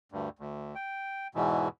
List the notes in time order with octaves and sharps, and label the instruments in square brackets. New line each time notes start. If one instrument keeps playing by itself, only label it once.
[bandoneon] D2 G2
D2
G5
E2 G#2 B2 E3